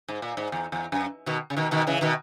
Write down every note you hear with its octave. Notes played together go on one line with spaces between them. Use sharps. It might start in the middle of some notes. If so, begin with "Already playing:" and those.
G#2
A#2
G#2
E2
E2
F#2
B2 D#3
C#3
B2 D#3
B2 D#3
C#3 E3
B2 D#3